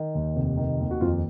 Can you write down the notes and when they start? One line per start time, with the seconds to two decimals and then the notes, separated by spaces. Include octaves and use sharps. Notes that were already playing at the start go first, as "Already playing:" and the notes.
Already playing: D#3
0.15 D#2
0.36 F1
0.57 D#3
0.80 D#2
0.91 F#4
1.01 F2 F4